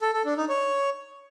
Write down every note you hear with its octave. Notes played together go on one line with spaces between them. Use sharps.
A4
A4
D4
D#4
C#5